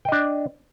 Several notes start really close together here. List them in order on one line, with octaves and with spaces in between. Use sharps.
G5 D#5 D4